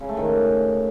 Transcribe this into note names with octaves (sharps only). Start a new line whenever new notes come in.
C#3
A3
D#3
C#3